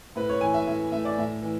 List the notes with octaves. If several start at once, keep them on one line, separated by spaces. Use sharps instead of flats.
A2 B4
C#5
E3 G#5
E5
A2 E5
A3 E5
D5
A2 E5
E3